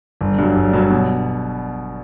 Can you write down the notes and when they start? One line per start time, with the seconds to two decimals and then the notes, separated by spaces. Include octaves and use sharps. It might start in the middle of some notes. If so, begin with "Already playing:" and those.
0.21 G1
0.38 G2 F#3
0.55 G1
0.73 G2 F#3
0.90 B2